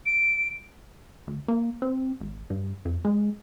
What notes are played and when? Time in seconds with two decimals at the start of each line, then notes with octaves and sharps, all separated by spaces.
0.06 D7
1.27 D2
1.48 A#3
1.82 C4
2.20 G#1
2.50 G2
2.85 F2
3.05 G#3